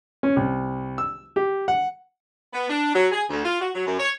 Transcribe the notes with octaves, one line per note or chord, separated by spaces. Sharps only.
C#4
C2
E6
G4
F#5
B3
D4
F#3
G#4
D2
F4
F#4
F#3
F#2
C#5